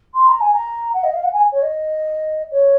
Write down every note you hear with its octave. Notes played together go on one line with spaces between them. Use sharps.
C6
A#5
G#5
A#5
F#5
D#5
F5
F#5
G#5
C#5
D#5
C#5